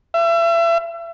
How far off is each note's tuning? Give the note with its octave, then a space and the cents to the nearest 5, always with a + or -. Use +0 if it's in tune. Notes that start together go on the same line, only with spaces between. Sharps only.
E5 +35